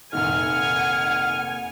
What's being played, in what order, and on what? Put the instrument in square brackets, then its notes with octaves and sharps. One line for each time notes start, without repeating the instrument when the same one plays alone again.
[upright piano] F1 A#2 D#3 [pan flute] F#5 [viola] G#5 [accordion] F6